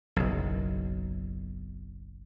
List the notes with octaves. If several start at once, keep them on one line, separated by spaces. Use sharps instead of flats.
F#1 B1